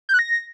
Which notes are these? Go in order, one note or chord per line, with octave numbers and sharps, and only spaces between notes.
G6
F#6
A#6